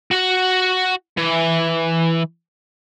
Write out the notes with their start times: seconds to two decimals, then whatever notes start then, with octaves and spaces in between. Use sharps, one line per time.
0.11 F#4 F#5
1.18 E3